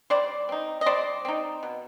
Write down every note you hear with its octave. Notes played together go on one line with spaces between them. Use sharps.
G3 C5 D5
C4 D#4
D#5
G3 C5 D5
C4 D#4
B2